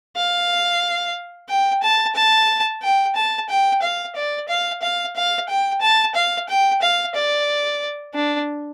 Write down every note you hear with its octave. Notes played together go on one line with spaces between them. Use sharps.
F5
G5
A5
A5
G5
A5
G5
F5
D5
F5
F5
F5
G5
A5
F5
G5
F5
D5
D4